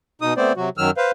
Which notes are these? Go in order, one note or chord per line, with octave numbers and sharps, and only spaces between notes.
B2 D#4 D#6
A3 B3 C4 C5 D5
C3 F#3 F#4
F#2 D#3 F#3 E6 F6
B4 C5 F5